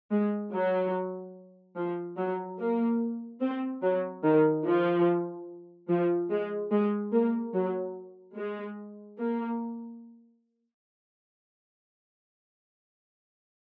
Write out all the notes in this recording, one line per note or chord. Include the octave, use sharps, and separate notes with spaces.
G#3
F#3
F3
F#3
A#3
C4
F#3
D#3
F3
F3
G#3
G#3
A#3
F#3
G#3
A#3